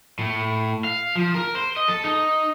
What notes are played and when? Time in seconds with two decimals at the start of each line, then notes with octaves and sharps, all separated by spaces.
0.19 A2
0.84 F5
1.15 F3
1.35 A#4
1.55 C5
1.77 D#5
1.88 A4
2.04 D#4